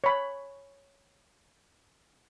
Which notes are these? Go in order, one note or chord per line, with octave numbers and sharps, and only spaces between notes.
C#5 B5